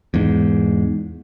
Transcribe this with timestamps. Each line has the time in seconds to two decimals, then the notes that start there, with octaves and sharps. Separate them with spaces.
0.14 E2 G#2